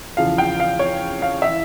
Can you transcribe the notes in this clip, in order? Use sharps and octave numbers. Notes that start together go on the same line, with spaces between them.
E2 C#3 F3 F5
G5
F5
C#5
F5
E5
E3